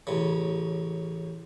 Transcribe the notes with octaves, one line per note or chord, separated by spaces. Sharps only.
A1 C#3